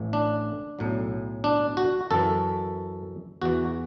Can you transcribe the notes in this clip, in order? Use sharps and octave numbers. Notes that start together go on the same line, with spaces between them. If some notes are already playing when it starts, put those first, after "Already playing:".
Already playing: A1 A2 E3
D4
B1 A2 F#3
D4
F#4
F#2 E3 A4
E2 E3 F#4